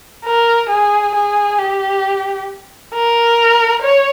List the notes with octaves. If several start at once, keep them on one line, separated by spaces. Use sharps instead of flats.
A#4
G#4
G#4
G4
A#4
C#5